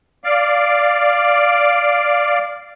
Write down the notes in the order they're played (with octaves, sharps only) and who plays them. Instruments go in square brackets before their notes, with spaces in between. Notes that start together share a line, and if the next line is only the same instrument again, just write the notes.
[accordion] D5 F5